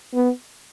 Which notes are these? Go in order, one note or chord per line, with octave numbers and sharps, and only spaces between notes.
B3